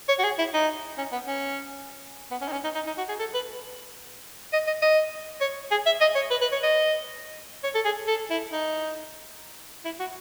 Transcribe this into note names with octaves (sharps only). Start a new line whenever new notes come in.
C#5
F#4
G#4
E4
D#4
C#4
B3
C#4
B3
C#4
D#4
C#4
D#4
D#4
D#4
F#4
G#4
A4
B4
D#5
D#5
D#5
C#5
G#4
E5
D#5
C#5
B4
B4
C#5
D#5
C#5
A4
G#4
A4
E4
D#4
E4
F#4